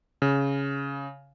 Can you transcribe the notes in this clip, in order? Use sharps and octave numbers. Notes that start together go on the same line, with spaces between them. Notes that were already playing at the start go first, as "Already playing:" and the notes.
C#3